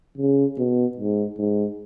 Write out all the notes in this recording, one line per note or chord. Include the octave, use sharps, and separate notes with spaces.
C#3
B2
G#2
G#2